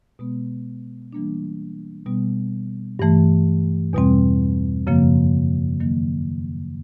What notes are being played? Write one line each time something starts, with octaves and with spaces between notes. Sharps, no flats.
B2 G#3 B3
E3 G3 A#3 D4
B2 G3 B3
G2 E3 A3
E2 B2 G3 C4
F#2 C#3 F3 A#3
D#3 F#3 A#3